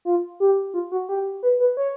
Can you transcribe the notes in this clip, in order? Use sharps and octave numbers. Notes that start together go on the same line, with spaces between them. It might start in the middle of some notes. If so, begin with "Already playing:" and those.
F4
G4
F4
F#4
G4
B4
B4
C#5